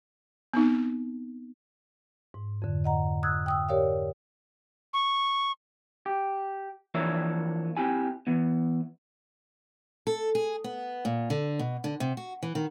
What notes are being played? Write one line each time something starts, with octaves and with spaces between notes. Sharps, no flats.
B3 C4 D#4
G#2
F2 D3
D#5 F#5 A#5
D#6 E6 F#6 G#6
G5 D#6 E6
G4 A#4 C#5 D5 F5
C#6
G4
E3 F3 A#3 D4 C#5 E5
C4 E4 G4 G#5
E3 B3
A4
G#4
B3
A#2
D3
B2
D3
C3
F#4
E3
D#3